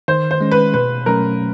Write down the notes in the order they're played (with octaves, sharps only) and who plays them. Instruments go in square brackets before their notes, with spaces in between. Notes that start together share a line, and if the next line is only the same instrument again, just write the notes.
[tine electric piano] D#3 [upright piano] C5
[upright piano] C5
[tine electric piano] G#3 C#4
[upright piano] B4
[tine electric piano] B2 [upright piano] B4
[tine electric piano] F#3 A3 C#4 [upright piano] A#4